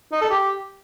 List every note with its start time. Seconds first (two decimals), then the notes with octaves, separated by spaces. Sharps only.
0.12 D#4
0.21 A4
0.30 G4